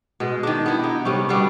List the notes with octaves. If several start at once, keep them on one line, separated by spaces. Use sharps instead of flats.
B2 G#3
D#3 D4
B3 E4
D#4 G4
C3 G3 A3 C#4
B2 D3 G3 B3